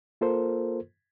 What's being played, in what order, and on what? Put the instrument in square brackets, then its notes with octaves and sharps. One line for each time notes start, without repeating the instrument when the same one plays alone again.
[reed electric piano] A#3 F4 A4 A#4 C5